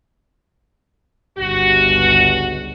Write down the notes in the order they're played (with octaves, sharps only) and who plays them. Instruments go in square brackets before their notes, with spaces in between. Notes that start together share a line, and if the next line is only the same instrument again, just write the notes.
[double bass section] G1 C#2 [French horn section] F#4